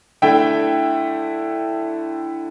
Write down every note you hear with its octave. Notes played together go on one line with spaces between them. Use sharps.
D3 A3 E4 E5 G5